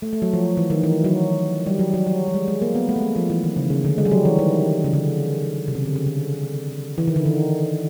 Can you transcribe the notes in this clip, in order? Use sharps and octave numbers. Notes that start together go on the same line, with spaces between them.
A3
A3
F#3
F3
E3
D#3
E3
F#3
G3
F#3
F#3
F#3
G3
G#3
G#3
A#3
B3
A3
G#3
A3
F3
E3
D#3
C#3
C#3
D3
G#3
G3
F#3
E3
D#3
C#3
D3
C3
C#3
D3
C#3
D3
E3
D#3
D3
D#3